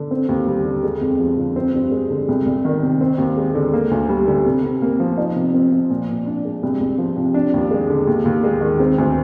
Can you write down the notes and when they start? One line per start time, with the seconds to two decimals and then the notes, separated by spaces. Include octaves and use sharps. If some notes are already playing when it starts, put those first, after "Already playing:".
Already playing: D3
0.11 C4
0.29 D#2
0.47 G3
0.65 D3
0.83 G#3
1.01 F2
1.19 F3
1.38 D3
1.56 C4
1.74 G2
1.91 G#3
2.10 D3
2.28 C2
2.46 C2
2.65 D#3
2.83 C3
3.01 C4
3.18 D#2
3.37 G#3
3.55 D3
3.74 A#3
3.91 D2
4.09 G3
4.27 D3
4.46 C3
4.64 C3
4.82 A#3
5.00 F3
5.18 D#4
5.36 C3
5.54 C4
5.72 F3
5.90 A#2
6.09 A#2
6.26 D4
6.45 G#3
6.63 C2
6.81 C2
6.98 F3
7.17 C3
7.34 D4
7.54 D#2
7.71 G#3
7.90 D3
8.07 D#2
8.25 D#2
8.44 G#3
8.61 D#3
8.80 C4
8.98 D2